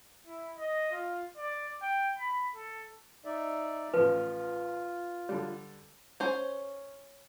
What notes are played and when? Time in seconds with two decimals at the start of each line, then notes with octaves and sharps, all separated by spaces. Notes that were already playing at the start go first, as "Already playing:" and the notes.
0.27 E4
0.59 D#5
0.92 F4
1.37 D5
1.82 G5
2.18 B5
2.56 A4
3.25 D#4 D5 E5
3.94 A1 F3 F4 B4
5.29 D3 G3
6.20 C#4 C5